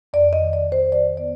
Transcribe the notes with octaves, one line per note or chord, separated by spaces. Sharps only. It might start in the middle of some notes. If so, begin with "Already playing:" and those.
F2 D5
D#5
D#3
D5
F2
C5
D#3 D5
B3 D5